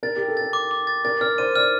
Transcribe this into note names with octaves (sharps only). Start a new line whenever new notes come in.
A#4 A6
G4 A6
A4
A#4 A6
D6
D6
A6
A#4 A6
A#4 F6
C5 D#7
D5 F6